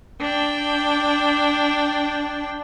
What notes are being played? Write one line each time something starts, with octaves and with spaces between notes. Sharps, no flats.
D4 G5